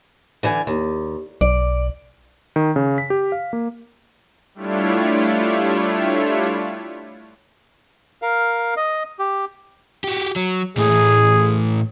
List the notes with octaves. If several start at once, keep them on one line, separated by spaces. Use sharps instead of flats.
D3 E3 G#5
D#2
B1 D5
D#3
C#3
B6
G4
F5
A#3
G3 A3 D4 E4 F4 C#5
A#4 F5
D#5
G4
F#4 G4
F#3
A2 E3 A3 G#4